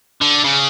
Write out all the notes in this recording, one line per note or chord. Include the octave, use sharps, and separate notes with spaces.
D3
C#3